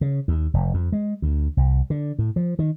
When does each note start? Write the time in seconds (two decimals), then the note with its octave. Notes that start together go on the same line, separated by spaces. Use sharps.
0.01 C#3
0.28 D#2
0.54 F1
0.74 F2
0.92 G#3
1.22 D2
1.57 C2
1.90 D3
2.19 A2
2.36 F3
2.59 D#3